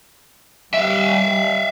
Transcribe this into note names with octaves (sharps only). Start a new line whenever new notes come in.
G3 E5 F5